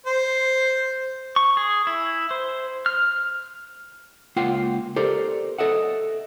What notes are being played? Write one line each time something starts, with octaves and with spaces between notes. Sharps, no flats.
C5
C#6
G#4
E4
C5
F6
C#2 A#3 F4 F#5 G5 C6
G4 A4 A#4 C5 D5
A4 D#5 E5 F#5